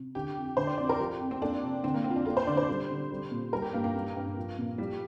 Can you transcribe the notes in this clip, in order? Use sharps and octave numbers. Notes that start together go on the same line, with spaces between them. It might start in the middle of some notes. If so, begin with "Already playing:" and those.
Already playing: C3
D3 G4
F2
D3 C5
D5
F2 D5
A#4
F3 G4
F2
C4
A#3 D4
C3
D3 C4
A#3
F2 C4
F4
D4
A#3 F4
C5
D3 D5
C5
G3
D3
G3
A#2
G3 A#4
G4
G2 A#3
A#3
G3
G2
F3
A#2
F3 G3